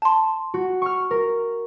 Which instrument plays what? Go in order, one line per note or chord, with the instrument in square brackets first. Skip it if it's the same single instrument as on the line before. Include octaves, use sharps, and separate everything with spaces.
[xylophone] A5 C6
[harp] F#4
C#6 F6
A#4